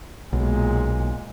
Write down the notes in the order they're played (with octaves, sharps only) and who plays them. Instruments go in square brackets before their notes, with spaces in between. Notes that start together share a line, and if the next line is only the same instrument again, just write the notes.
[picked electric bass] B1 [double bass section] A#2 G#3